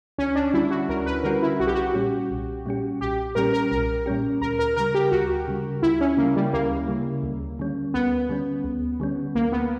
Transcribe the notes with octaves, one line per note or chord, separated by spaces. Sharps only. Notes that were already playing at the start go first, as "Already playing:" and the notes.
D2 C#4
D4
D3 G3 C#4 E4 F#4
F#4
D2 A#4
B4
D3 G3 C#4 F#4 A#4
E4
B1 F#4
G4
F#4
A#2 G3 C#4 G4
B1
A#2 G3 C#4 G4
B1 G4
A#2 G3 C#4 G4 A#4
A#4
B1 A#4
A#2 G3 C#4 G4
D2 A#4
A#4
C#3 G3 A#4
G4
D2 F#4
C#3 G3
D2 E4
C#4
C#3 G3 A#3
G3
D2 A#3
C#3 G3
D2
D3 G3 C#4
D2 B3
D3 G3 C#4
D2
D3 G3 C#4
D2 A#3
B3